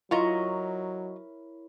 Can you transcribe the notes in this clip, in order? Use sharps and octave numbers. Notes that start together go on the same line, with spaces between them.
F#3 E4 F4 A#4 C#5 D#5 A#5 C#6